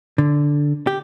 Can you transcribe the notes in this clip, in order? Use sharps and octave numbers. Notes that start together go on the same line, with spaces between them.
D3
G4